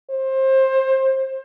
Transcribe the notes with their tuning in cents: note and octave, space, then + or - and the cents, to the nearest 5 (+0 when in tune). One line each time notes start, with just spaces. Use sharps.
C5 +25